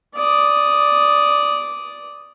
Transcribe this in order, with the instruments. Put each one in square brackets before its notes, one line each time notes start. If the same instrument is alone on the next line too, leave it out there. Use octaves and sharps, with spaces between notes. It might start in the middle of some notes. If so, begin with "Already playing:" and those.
[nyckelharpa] D5 D#6